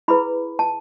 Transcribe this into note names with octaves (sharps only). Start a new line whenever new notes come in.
E4 G#4 B4 B5
A5